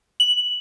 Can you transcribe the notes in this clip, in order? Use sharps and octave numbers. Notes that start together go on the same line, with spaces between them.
F#7